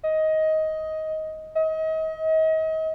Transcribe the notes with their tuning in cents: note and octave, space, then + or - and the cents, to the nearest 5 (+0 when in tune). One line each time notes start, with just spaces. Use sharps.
D#5 +15
D#5 +35